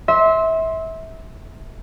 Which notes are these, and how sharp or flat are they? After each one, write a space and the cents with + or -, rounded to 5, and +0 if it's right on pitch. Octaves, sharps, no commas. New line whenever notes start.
E5 -25 C6 +10